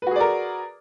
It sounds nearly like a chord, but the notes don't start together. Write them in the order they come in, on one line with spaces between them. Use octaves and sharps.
B4 F#4 G#4 D5 A#4